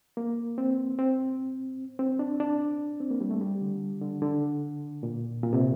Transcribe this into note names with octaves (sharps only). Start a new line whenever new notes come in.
A#3
C4
C4
C4
D4
D4
C4
A#3
G3
A3
G3
D3
D3
D3
A#2
A#2
C3